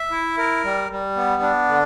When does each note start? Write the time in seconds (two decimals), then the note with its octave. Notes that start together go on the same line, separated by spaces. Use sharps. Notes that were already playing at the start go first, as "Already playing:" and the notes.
Already playing: E5
0.11 E4
0.38 A#4
0.64 G3
0.90 G3
1.17 B3
1.42 D4
1.69 D3